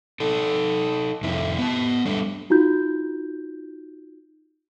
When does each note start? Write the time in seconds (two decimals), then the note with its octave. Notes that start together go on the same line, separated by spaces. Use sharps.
0.20 D#4 A4
1.23 F2 C3 E4
1.58 B3 A5
2.05 G3 A3 D4
2.50 D#4 F4 F#4 G6